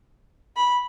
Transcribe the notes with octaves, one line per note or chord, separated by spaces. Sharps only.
B5